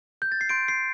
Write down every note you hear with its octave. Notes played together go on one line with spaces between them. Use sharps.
G6
A6
C7
C6 G6 D7
C7